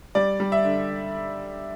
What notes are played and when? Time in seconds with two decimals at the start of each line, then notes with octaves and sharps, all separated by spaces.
0.15 G3 D5
0.40 G3
0.52 E5
0.64 D3